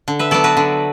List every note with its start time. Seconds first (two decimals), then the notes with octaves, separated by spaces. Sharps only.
0.08 D3
0.19 B4 E5
0.31 F#3 B3 A4 D5
0.44 F#4 B4
0.57 D3